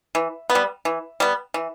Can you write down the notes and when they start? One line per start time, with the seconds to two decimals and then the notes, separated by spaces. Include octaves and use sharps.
0.15 E3
0.50 B3
0.55 G3
0.85 E3
1.20 G3 B3
1.54 E3